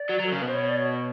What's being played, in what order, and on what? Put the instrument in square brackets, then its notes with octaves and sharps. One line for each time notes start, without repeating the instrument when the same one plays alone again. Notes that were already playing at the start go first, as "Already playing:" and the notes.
Already playing: [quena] D5
[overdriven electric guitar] F#3
F#3
[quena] A4
[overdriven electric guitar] C#3 [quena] A#4
[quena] B4
[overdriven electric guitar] B2 [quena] C5
[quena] C#5
D5
C#5